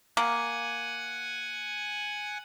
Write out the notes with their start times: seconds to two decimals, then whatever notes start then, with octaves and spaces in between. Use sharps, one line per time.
0.17 A#3 F#5 G#5